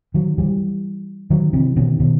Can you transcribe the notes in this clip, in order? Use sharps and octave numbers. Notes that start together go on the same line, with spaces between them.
D#3 F#3
E3 G3
D#3 F#3
C3 E3
B2 D#3
B2 D#3